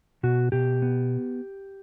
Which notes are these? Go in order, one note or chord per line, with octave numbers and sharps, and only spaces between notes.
B2 F#4
B2 G4
B3